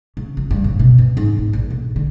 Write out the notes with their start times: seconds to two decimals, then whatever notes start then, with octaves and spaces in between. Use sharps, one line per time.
0.17 C#3
0.37 F3
0.51 G2
0.64 C#3
0.79 B2
0.98 F#2
1.17 G#2
1.38 D#4
1.53 A#1
1.71 B1
1.96 D3